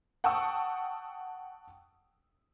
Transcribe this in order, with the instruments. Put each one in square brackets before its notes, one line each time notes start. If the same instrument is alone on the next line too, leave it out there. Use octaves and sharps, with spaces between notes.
[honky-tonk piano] F#5 G5 A5 C#6 D#6 E6